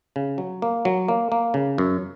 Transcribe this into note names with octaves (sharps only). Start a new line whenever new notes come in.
C#3
F#3
A#3
F#3
A#3
A#3
C#3
F#2